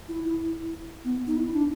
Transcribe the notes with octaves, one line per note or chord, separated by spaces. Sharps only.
E4
E4
B3
D#4
E4
D4